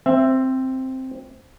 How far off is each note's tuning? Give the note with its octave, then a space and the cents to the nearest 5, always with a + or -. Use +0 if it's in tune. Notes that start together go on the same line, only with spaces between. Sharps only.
C4 +0 E5 +15